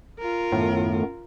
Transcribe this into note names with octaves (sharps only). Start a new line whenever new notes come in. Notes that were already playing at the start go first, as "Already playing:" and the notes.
F4 A#4
F#2 A2 D#3 B3